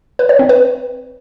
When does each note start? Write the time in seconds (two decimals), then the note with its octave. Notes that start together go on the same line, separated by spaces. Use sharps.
0.19 B4
0.29 C#5
0.39 C4
0.49 B4